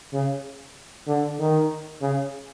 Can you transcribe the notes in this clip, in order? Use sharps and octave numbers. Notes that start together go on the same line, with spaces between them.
C#3
D3
D#3
C#3